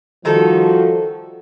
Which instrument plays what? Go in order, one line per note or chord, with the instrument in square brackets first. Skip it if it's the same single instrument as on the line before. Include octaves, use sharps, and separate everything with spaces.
[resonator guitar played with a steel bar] D#3 D#4 A4 [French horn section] F3 G3 F#4